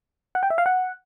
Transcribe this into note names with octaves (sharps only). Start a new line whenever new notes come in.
F#5
G5
E5
F5
F#5